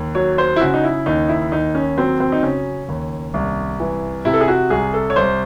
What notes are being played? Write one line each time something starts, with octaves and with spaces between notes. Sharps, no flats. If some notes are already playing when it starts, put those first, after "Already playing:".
Already playing: D#2
F#3 C#5
C5
E4
C#3 F#4
D#4
E4
D#2 D#4
E4
D#2 D#4
C#4
F#3 C4
C4
D#4
C#3 C#4
D#2
C2
E3
C3 E4
A4
G#4
F#4
C2 G#4
A4
C#5
C2 C5